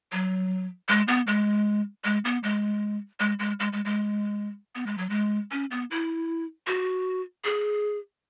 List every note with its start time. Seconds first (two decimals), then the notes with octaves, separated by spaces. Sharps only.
0.12 F#3
0.89 G#3
1.08 B3
1.27 G#3
2.05 G#3
2.25 B3
2.43 G#3
3.20 G#3
3.39 G#3
3.60 G#3
3.73 G#3
3.85 G#3
4.75 B3
4.86 G#3
4.98 F#3
5.09 G#3
5.52 C#4
5.71 B3
5.91 E4
6.67 F#4
7.45 G#4